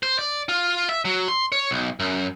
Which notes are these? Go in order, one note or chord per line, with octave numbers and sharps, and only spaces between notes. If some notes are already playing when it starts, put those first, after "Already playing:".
C5
D5
F4
E5
F#3
C6
C#5
B1
F#2